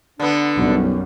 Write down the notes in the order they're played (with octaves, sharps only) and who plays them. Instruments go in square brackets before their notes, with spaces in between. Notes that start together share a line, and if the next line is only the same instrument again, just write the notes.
[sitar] D3 B3 [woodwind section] D4
[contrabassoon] B1 [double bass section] F#2 G3